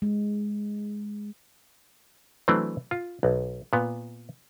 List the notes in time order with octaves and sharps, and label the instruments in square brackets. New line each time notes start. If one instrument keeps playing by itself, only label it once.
[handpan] G#3
[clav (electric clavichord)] E3 F#3 A3 C4 D4
F4
B1
A#2 B3